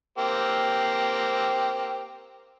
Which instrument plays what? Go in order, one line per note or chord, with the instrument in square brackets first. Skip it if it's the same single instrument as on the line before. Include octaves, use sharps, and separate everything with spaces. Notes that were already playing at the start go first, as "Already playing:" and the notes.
[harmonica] A#3 C4 G4